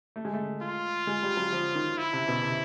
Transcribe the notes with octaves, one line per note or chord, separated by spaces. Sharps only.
A3
G#3
A3
F4
G#3
G3
F#3
F3
D#3
E4
C3
B2
C3